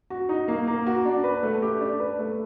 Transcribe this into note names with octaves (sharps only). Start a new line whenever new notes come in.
F#4
D#4
A#3
A#3
F#4
D4
B4
A3
G4
D4
B4
A3